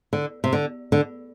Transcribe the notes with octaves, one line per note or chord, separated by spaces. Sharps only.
D3
C3
D3
D3